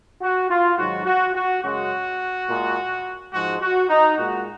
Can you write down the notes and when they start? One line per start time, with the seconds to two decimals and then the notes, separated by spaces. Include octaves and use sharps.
0.21 F#4
0.50 F4
0.77 G#2 D#3 F#3 F#4
1.06 F#4
1.35 F#4
1.63 F#2 C#3 G#3 F#4
2.48 A#2 G#3
3.32 G#2 F3 G#3 F#4
3.61 F#4
3.89 D#4
4.17 A#2 G#3 F#4